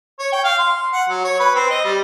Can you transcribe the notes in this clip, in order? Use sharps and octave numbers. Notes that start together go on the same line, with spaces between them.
C#5
G5
F5
C6
F#5
F#3
C#5
B4
C4
D#5
G3